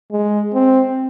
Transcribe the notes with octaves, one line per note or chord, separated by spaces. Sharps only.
G#3
C4